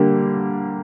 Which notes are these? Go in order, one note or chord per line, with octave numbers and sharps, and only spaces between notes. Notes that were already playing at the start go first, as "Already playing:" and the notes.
Already playing: D3 G3 A#3